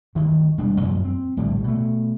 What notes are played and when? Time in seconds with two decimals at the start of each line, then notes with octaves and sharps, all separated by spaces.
0.15 D2 G2 D#3
0.58 E1 G3 D4
0.81 F#2 A#2 F3
1.05 C4
1.37 A#1 A2 D3 G3
1.64 B2 A3